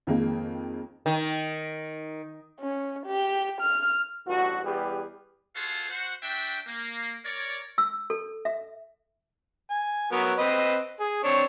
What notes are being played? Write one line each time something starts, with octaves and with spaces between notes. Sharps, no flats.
F2 D#3 G#3 A#3
D#3
C#4
G4
F6
A1 G2 F#4
E2 G3 G4 G#4 B4
F4 F#4 G#4 A4 C5 F5
F#4 C5 F#5
D4 F#4 D5 E5 G5
A#3
A#4 C#5 D5
E6
A4
E5
G#5
F#3 B3 A#4
C4 B4 D#5
G#4
C4 D4 C#5